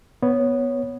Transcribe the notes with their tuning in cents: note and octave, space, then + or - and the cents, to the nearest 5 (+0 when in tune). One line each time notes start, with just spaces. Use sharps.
B3 +0 C#5 +0